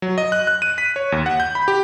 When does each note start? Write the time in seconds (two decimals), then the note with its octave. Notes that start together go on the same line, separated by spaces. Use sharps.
0.02 F#3
0.18 D#5
0.32 F#6
0.47 F#6
0.62 D#7
0.78 B6
0.96 C#5
1.12 D#2
1.26 F#5
1.40 G6
1.55 B5
1.68 G4